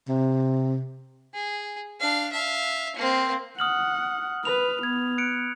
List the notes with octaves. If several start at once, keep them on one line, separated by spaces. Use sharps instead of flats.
C3
G#4
D4 F5
E5 F5
A#3 C4
F#5 D#6 F6 F#7
B4 B5 F7
B3 G#6
F#6 C#7 D7